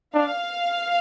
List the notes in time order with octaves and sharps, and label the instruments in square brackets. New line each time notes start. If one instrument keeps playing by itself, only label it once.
[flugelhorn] D4 [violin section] F5